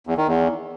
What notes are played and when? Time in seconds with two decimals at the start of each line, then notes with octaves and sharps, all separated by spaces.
0.07 E2
0.17 D#3
0.28 E2